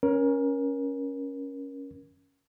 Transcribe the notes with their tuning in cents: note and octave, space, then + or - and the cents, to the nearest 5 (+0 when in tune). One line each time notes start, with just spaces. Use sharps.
C#4 +0 A#4 +25